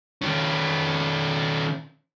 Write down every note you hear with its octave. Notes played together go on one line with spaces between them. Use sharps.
D#3 C#4